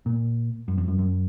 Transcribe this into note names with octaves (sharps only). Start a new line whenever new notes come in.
A#2
F#2
F2
F#2
F#2